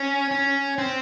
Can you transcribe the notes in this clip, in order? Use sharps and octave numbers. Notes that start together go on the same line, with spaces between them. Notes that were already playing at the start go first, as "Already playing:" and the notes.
Already playing: C#4
C#4
C4